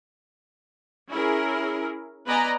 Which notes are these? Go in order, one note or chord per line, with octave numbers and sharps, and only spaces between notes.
C#4 E4 G#4 A#4
B3 B4 D5 D#5 G#5 A#5